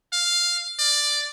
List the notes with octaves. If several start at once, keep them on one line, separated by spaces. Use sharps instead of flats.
F5
D5